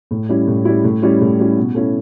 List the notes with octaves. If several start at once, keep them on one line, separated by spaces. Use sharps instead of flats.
A2
G3 C#4 E4
A2
G3 C#4 E4
A2
G3 C#4 E4
A2
G3 C#4 E4
B2
A3 C#4 E4